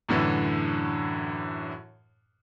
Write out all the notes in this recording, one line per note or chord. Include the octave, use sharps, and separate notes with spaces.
F#2 A2 D3 E3